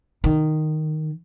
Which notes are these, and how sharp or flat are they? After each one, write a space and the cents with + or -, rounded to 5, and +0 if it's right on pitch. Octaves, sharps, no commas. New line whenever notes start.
D#3 -5